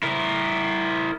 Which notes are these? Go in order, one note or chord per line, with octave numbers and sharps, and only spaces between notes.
E4 A#4